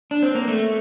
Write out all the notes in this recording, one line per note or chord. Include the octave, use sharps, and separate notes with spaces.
D4
C4
A#3
A3